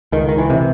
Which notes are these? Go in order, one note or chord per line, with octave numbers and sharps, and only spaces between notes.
C#2 D#3
D#3
E3
C3